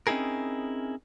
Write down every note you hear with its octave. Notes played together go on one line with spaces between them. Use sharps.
C4 C#4 D#4 E4 G#4 A#4